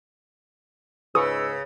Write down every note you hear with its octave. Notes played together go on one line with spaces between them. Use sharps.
C#2 G#2 C#3 G#4 B4 C#6 D#6 E6